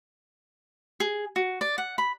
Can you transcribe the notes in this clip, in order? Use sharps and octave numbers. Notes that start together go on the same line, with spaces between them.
G#4
F#4
D5
F#5
B5